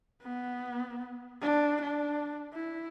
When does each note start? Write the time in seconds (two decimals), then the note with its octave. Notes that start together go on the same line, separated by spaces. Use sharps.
0.23 B3
1.42 D4
1.82 D4
2.53 E4